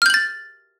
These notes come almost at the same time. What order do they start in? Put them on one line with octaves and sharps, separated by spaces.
F6 G6 F#7 A6